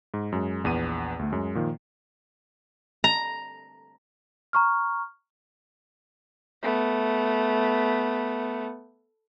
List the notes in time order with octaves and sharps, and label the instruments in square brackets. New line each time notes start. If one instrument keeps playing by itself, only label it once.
[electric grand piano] G#2
F#2 G#3
A#1 E2 B3 D#7
D2 A3
F#2 G#3
A#2 D#3 F3
[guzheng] A#5
[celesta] A#5 C#6 F6
[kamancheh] A3 B3